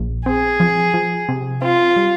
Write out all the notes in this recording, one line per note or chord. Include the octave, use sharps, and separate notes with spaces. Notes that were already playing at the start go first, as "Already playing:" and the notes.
Already playing: A#1
C4 G#4
F3
F3
C3
C4 F4
G3